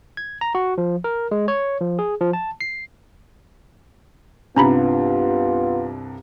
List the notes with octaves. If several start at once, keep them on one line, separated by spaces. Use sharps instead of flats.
G#6
A#5
F#4
F3
A#4
G#3
C#5
F3
G#4
F3
A5
C7
C2 G2 C3 B3 C#4 F4 A#5 B5